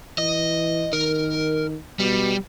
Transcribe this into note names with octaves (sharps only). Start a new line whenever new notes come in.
E3 D#5
D#3 A#4
B2 G3